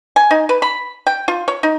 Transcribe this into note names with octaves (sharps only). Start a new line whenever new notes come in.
G#5
D#4
B4
B5
G5
F4
C#5
D#4